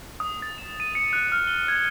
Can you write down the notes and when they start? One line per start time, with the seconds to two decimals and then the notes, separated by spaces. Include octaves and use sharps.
0.20 D#6
0.42 A6
0.58 E7
0.80 D#7
0.95 C#7
1.13 F#6
1.32 F6
1.47 G7
1.68 G#6